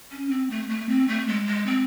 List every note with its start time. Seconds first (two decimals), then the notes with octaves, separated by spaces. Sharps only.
0.12 C#4
0.30 C4
0.50 A3
0.69 A3
0.89 C4
1.08 A3
1.28 G#3
1.47 G#3
1.66 C4